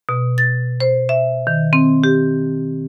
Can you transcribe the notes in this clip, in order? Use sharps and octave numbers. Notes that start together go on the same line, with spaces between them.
B2
A6
C5
E5
D#3
C4
G4